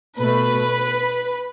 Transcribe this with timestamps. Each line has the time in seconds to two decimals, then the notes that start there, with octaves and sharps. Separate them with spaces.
0.19 B2 A3 B4